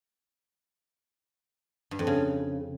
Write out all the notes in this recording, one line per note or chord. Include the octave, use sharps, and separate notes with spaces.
G2
F2
C#3